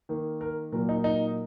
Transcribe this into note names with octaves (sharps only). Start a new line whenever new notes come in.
D#3 A#3
A#4
A#2 F#3 A#3 A#4
D#4
D#4